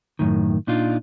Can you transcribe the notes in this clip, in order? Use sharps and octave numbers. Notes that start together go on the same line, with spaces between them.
F#2 A2 D#3
A#2 D4 D#4 F4